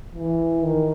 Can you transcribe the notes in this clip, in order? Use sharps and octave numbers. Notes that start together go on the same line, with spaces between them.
E3
D#3